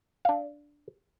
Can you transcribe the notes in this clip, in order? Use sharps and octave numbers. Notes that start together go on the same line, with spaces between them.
D4 F5